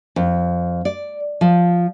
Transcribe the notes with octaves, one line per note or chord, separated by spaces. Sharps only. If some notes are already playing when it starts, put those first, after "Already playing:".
F2
D5
F3